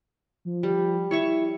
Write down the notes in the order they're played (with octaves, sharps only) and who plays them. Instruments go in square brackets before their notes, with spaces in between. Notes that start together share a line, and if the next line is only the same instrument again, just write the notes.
[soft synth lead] F3
[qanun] G3
[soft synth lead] E4 [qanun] C#5 E5 C#6